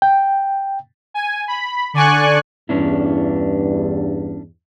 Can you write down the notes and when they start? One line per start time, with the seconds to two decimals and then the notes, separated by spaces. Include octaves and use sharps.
0.02 G5
1.14 G#5
1.48 B5
1.94 D3 D5 G#5 C#6 F#6
2.69 E2 G2 C#4 D4 E4